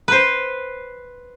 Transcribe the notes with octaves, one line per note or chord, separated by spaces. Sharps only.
B4 C5